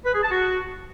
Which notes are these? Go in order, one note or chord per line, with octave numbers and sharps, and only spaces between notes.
B4
G#4
A5
F#4